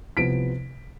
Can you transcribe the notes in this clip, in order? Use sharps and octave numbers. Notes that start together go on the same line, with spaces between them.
C2 C3 F3 B3 B6 D7